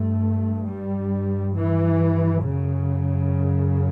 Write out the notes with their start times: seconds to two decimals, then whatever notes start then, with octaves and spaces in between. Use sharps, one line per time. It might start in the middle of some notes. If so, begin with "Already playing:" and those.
Already playing: G2 A3
0.68 G3
1.55 E3
2.45 F#2 C#3